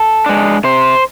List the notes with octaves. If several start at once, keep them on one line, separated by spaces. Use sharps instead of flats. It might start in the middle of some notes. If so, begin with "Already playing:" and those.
Already playing: A4
G#3 D4
C3 C5